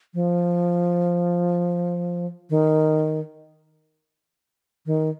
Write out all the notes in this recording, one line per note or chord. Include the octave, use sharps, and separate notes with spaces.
F3
D#3
D#3